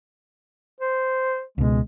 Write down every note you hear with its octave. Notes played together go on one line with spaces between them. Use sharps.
C5
C#2 B2 G#3